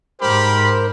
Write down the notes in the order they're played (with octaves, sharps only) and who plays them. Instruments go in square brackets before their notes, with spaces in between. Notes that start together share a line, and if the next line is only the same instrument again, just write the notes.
[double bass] G#2 [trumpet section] G4 B5 [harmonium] A#4 C5